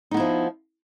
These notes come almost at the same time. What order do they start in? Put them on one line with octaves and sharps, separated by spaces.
D#4 B3 E4 F3